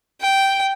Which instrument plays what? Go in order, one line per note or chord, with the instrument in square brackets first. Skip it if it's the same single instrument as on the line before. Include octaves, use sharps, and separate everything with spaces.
[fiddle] G5